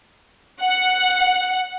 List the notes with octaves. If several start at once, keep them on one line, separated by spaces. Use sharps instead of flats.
F#5